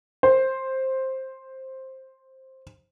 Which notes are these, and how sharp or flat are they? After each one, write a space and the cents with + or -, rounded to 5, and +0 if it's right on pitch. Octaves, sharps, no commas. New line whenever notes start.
C5 +10